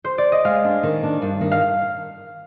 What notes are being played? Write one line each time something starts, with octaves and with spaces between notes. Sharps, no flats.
C5
D5
D#5
G#3 F5
D4
D#3
D4
G2
D#3
F5